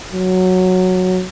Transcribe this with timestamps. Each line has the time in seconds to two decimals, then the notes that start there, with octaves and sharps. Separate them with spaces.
0.13 F#3